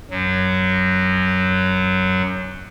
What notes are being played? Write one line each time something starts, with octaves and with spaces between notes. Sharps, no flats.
F#2 F#3